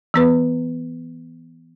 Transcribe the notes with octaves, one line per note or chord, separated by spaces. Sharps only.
E3 B3 B4